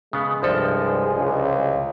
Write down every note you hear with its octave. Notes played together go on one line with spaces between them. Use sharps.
C#3 G#3 B3
C2 G2 F3 A4
C#2